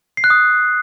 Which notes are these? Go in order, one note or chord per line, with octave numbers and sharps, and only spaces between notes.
C7
F#6
D#6